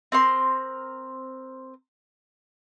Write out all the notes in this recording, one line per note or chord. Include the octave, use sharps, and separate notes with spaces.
C4 A#4 C6